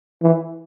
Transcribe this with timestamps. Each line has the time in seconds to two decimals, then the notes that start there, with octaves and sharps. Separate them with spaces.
0.23 E3